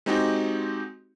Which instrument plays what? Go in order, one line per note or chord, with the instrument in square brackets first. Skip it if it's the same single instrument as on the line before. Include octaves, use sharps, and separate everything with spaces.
[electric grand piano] G#3 C4 D#4 F#4 G4